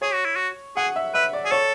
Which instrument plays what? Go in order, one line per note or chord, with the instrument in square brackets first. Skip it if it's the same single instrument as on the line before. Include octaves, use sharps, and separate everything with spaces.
[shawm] G#4 [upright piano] C#5
[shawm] F#4
E4
F#4
[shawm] G#4 [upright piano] F#5
[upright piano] E5
[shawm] B4 [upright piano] E5
[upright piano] D5
[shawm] G#4
[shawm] A4 [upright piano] C#5